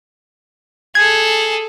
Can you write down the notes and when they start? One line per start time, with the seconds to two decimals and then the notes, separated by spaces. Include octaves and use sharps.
0.95 G#4 A4 G#6